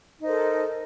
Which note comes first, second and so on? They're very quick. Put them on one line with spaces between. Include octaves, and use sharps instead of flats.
D#4 C5 A#4 A4